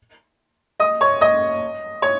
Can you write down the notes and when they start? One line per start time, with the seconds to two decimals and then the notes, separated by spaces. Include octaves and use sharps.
0.80 D#5 D#6
1.01 C#5 C#6
1.21 D#5 D#6
2.02 C#5 C#6